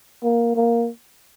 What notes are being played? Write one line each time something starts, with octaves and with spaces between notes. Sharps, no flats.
A#3
A#3